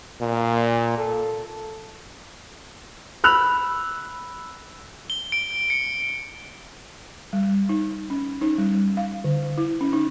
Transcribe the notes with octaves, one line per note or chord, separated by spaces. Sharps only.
A#2
A4
B5 E6 F#6 F7
G7
D7
C#7
G3
D#4
C#4
D#4
G3
F5
D3
E4
C#4
D#4